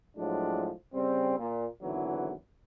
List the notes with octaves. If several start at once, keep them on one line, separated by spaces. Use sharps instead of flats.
A2 F3 F#3 G#3 D4
C#3 G3 C4
A#2
G#1 E2 D3 E3 F#3